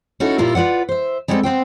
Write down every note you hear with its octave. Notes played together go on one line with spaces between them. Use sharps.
C#4 D#4 E4 F#4 A4
A#2 G3 E4 F4 A#4
F4 B4 D5 F#5
C5 E5
G3 G#3 B3 C4 A4
B3 C4 C5 G5